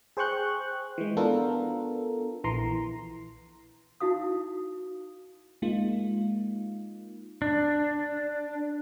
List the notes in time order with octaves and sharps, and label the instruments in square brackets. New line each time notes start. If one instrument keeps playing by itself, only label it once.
[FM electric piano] G#4 C5 G5 C#6 F#6 G6
E3 G#3
B3 D4 F4 A4 A#4
A#1 E3 A#5 C6
[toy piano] D#4 E4 F#4 F5 D#6
[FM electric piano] G#3 A#3 D#4 F4
[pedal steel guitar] D4